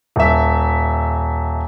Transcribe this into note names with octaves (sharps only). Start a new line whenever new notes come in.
D#1 E5